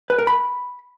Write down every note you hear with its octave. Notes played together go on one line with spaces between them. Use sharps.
B4
A#4
B5